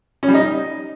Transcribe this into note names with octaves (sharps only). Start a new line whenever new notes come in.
C#4
G3
D#4